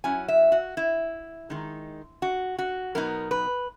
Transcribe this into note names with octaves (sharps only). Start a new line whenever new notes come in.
F#3 C#4 E4 G#5
E5
F#4
E4
D#3 G#3 D#4
F#4
F#4
B2 F#3 B3 D#4 A#4
B4